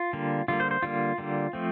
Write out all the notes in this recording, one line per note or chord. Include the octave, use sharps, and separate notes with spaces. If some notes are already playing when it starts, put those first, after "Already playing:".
Already playing: F4
D3 G3 A#3
D3 G3 A#3 F4
C5
C5
D3 G3 A#3 F4
D3 G3 A#3
F3 A3 C4